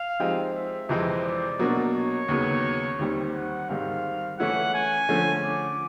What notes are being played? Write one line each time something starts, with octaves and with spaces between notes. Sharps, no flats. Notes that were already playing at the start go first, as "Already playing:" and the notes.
Already playing: F5
F3 G#3 C4 D#4 G4
E5
F2 C3 E3 G#3 C4 D#5
D5
B2 F#3 A#3 D4
C#5
D#2 C#3 F#3 B3
D#2 D#3 G3 C4
F#5
G#2 D#3 G3 C4 F5
E3 A3 C#4 E4 F#5
G#5
D3 F3 A3 C#4
D6